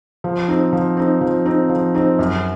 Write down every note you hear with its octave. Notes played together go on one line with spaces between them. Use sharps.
F3
C4 D#4
F3
C4 D#4
F3
C4 D#4
F3
C4 D#4
F#2